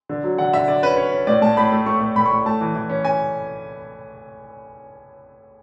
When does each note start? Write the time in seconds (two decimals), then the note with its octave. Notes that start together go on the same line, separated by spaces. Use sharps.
0.09 D3
0.24 F#3
0.38 D3 F#5
0.53 D3 E5
0.68 D3 D5
0.83 C#4 B4
0.97 C#4 C#5
1.12 C#4
1.27 A2 D5
1.42 A2 A5
1.57 A2 B5
1.72 A3
1.86 A3 C#6
2.01 A2
2.16 A2 B5
2.26 C#6
2.31 A2
2.45 A3 A5
2.61 E3
2.75 E3
2.89 C#4
3.05 C#4 G#5